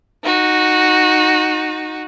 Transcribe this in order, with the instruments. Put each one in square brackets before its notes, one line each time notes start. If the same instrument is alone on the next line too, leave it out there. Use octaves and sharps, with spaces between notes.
[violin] D#4 F#4